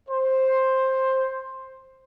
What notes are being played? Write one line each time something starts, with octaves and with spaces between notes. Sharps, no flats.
C5